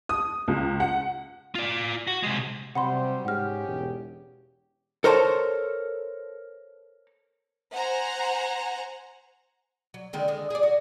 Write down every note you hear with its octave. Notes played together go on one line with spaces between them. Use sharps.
D#6
C#2
F#5
F4 D5
F#4
C3 G#3
C3 F#3 G3 C5 F#5 B5 C6
G#2 C#4 G4 G#4 F#5 F6
E1
A4 A#4 C5 C#5 G#5 A5
C5 F#5 G#5 A#5
F#3
D3 D#3 G#3
D3 G#3
G#4 D5
F#4